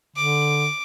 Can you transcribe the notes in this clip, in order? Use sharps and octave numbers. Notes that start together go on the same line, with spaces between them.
D3 D6